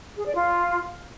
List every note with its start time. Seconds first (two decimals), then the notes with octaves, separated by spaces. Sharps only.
0.17 G#4
0.26 D5
0.36 F4